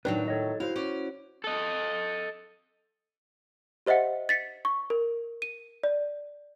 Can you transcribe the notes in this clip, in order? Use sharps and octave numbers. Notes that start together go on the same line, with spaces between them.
A2 D#3 F#3 D4 B4
A4 C#5 D#5
E4 F#4 C5 F5
C#4 D5
A4 D#5
G4 C5 D#5 E5 F#5 C#7
A6 B6 C#7
C#6
A#4
D#7
D5